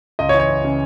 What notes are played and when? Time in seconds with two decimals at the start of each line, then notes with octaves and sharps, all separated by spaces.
0.19 C#2 D#5
0.29 C#5
0.34 E3
0.40 C#5
0.49 C#2
0.65 C#3